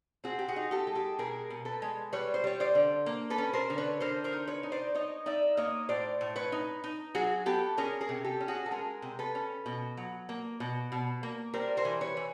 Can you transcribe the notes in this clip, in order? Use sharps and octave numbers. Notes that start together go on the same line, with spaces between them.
C4 F#4 G#4
G4
F#4 G#4
D#4
G4 A4
G#3
G4 A4
B2 G#4 A#4
B2
A4 B4
G#3
G3 B4 C#5
C5
G3 C#5
C5 D5
D3
A#3
A4 B4
C#4
A#4 C5
D3
B4 C#5
D3 A#4 C5
A#4 C5
D#4
B4 C#5
D#4
C5 D5
D#4 C#5 D#5
D#4 D5 E5
A#3 C#5 D#5
A2 C5 D5
A2
B4 C#5
D#4
D#4
F#3 F#4 G#4
B3 G4 A4
C#4 G#4 A#4
G#4 A#4
C3
G4 A4
C#4
F#4 G#4
A4
G#3 G#4 A#4
C3
A4 B4
C#4
B2
F#3
A#3
B2
B2
A#3
G3 A#4 C5
A#4 C5
E3
B4 C#5
E3